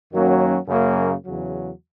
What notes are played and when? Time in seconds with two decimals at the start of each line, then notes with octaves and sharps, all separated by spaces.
0.11 F#2 D#3 F#3 A#3 C#4
0.68 F#2 C#3 F#3 A#3
1.25 E2 C#3 F#3